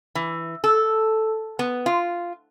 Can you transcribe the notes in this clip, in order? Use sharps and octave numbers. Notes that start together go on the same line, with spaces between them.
E3
A4
B3
F4